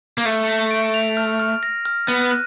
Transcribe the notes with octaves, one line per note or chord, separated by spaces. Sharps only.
A#3
A3 F6
A#6
D7
F7
F6
F6
A#6
F6
B3 D#7
F#6